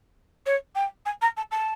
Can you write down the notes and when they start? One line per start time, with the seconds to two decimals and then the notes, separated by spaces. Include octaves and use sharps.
0.46 C#5
0.75 G5
1.05 G#5
1.21 A#5
1.37 A5
1.51 A5